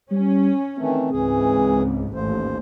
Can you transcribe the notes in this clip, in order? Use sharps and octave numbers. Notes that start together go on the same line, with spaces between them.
G3 C#4
D#3 E3 A3 C4
C#2 G#2 E3 G#4
A1 D#2 C5